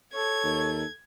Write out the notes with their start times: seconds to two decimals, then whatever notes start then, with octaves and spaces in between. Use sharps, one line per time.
0.14 A4 C#5 G#6
0.44 D#2